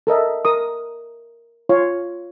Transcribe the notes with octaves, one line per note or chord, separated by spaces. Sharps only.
A4 A#4 D#5 E5
A#4 D#6
F4 C#5 F5